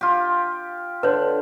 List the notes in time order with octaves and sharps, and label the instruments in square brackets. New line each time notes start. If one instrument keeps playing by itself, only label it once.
[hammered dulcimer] F4 G4
[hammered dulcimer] D3 [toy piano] B4 C#5